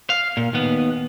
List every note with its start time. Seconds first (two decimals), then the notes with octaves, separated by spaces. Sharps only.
0.10 F5
0.37 A#2
0.53 D#2 B3